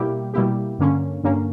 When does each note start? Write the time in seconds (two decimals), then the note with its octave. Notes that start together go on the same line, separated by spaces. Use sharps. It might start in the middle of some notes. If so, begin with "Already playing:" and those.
Already playing: B2 G3 A#3 E4 G4
0.34 B2 G3 A#3 E4 G4
0.79 G2 D3 A#3 C#4
1.24 G2 D3 A#3 C#4